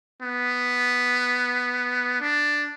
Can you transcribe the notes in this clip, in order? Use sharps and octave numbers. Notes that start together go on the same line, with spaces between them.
B3
D4